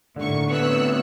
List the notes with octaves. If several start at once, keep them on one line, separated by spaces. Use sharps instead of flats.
D#2 A2 D3 C#6
A2 C3 B3 C#5 E6 F#6